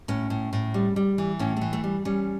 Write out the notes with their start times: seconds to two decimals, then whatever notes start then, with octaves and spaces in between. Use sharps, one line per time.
0.08 A2 C#4
0.30 A2
0.53 A2
0.74 G3
0.96 G3
1.18 E3
1.39 A2 C#4
1.57 E3 A3
1.73 A3
1.84 G3
2.05 G3 C#4